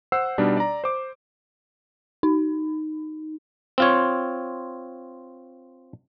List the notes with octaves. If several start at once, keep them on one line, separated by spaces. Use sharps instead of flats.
C5 F#5 E6 C7
B2 G3 D4 D#4
D5 A#5
C5 D6
D#4
C4 F4 C#5